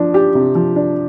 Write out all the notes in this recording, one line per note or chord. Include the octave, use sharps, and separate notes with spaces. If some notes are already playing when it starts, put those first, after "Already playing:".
Already playing: F3 D4
G4
C3
F3
D4